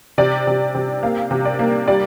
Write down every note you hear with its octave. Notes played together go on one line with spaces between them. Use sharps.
C3 D5
C3
C3
A#3 F5
C3
D5
A#3
G3 D5